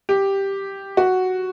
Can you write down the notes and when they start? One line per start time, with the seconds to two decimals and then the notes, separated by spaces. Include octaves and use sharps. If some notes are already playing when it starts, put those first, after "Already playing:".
0.09 G4
0.97 F#4